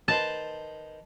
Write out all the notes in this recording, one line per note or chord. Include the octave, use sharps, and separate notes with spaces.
D#3 B4 C5 A5